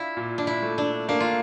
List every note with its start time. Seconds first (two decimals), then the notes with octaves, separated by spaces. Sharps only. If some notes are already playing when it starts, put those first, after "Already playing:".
Already playing: D4 E4 F4
0.17 A#2
0.38 D4
0.47 E4
0.62 A3
0.78 D4
1.09 A#3 D4
1.20 F4